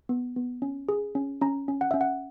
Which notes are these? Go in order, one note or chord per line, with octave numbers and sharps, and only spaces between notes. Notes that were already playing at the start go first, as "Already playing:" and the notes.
B3
B3
C#4
G#4
C#4
C#4 A#5
C#4
F#5
C#4 E5
F#5